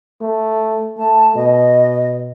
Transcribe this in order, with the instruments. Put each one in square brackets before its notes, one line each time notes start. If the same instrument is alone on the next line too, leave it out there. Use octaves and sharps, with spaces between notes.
[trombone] A3
[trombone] A3 [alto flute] A5
[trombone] B2 [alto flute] D#5